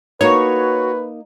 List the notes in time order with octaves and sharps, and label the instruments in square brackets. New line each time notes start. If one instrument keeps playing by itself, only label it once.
[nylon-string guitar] A#3 D#4 [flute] F#4 [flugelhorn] B4 [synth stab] C#5